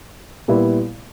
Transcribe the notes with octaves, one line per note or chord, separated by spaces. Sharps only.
A#2 G3 B3 E4